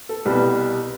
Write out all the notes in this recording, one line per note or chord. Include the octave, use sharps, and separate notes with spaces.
A4
C2 B2 G3